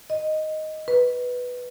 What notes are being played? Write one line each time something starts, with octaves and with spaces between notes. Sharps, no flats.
D#5
B4